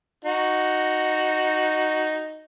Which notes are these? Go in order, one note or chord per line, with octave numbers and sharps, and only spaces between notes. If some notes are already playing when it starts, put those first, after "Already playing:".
D#4 F#4